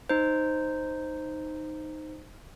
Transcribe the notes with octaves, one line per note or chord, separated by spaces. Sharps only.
D#4 C5